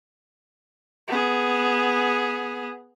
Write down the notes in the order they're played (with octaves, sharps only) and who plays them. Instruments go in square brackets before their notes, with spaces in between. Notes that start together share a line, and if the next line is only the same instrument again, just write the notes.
[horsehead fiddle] B3 G#4